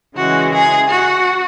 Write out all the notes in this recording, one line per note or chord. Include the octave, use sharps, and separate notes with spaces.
C#3 E3 G#3 F#4
G#4
F#4